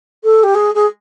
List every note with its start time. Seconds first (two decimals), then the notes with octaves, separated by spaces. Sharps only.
0.24 A4
0.43 G4
0.54 G#4
0.74 G#4